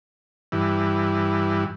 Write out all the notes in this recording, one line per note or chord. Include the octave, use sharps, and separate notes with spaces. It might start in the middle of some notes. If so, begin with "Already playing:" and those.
G2 E3